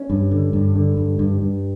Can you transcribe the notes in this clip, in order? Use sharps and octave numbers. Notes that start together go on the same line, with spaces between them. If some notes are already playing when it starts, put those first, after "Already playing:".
Already playing: C#4
G2
D3
G2
D3
G2
G2
G2